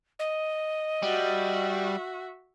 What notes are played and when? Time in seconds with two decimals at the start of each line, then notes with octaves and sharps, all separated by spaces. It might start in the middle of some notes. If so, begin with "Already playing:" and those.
0.19 D#5
1.02 G3 F#4 E5